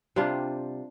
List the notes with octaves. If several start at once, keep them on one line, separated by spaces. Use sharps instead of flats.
C3 G3 D4 F4